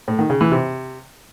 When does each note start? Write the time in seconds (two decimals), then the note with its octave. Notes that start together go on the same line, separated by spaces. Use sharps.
0.08 A2
0.19 D#3
0.30 C#3
0.41 E3
0.52 C3